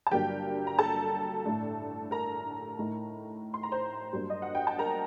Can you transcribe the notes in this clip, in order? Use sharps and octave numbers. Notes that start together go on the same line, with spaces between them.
A5
G1 G2 F#3 A#3 D4 G4 G5
A#5
A4 A5
A2 A3 D4
A#4 A#5
A2 A3 D#4
C6
A#5
C5 C6
G2 F#3 A#3 D4
D#5
F#5
G5
A5
A#4 A#5